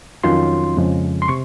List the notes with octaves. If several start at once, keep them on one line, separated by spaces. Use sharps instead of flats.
F2 D#3 F#3 C#4 F4 C6
F2 C#3 F3 G#3
C6
C3 C#6